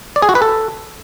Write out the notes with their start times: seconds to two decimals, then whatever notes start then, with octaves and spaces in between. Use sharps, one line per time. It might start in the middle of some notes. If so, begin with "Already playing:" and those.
0.16 D5
0.22 G#4
0.29 F#4
0.35 B4
0.42 A4